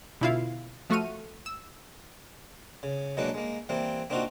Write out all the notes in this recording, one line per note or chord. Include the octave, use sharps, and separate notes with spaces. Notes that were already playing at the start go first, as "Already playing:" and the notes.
B2 D3 E4 F4 F5 C7
F3 A3 F#4 C#6 F6 D#7
E6
C#3
B2 F#3 G#3 A#3 D4 B4
G#3 A#3
E3 G3 A#3 C4
A#3 C4 D4 D#4 F4 F#4